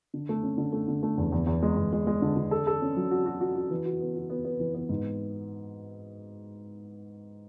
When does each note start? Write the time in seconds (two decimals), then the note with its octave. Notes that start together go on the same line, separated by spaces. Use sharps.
0.14 D3
0.29 A3
0.43 C#4
0.58 D3
0.73 A3
0.88 D3
1.03 A3
1.18 E2
1.32 E2
1.47 E2
1.63 G#3
1.77 E2
1.93 G#3
2.07 G#3
2.22 D3
2.37 D3
2.51 A4
2.67 A4
2.82 C#4
2.97 F#3
3.11 F#4
3.26 F#4
3.41 F#4
3.56 F#4
3.70 E3
3.86 F#4
4.00 B3
4.15 F#4
4.30 B3
4.44 B3
4.60 E3
4.74 B3
4.89 G#2